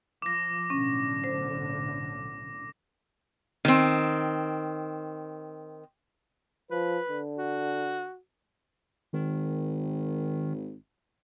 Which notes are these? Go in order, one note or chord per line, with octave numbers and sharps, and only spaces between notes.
F3 D6 A#6
B1 A2 D3 C#4
C5
D#3 C4
F3 B4
D3
F#4
G#1 D#3